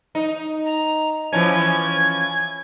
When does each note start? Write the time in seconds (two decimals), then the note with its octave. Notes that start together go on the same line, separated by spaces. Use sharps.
0.15 D#4
0.66 A#5
1.33 E3 F3 C#4 G#6